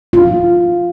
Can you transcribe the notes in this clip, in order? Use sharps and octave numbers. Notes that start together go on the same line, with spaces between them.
F4